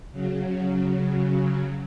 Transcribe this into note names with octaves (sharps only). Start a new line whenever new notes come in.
C#3 F#3